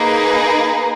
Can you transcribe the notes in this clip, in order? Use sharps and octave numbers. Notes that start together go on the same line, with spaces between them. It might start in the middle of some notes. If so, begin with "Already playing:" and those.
Already playing: A#3 D#4 G#4 B4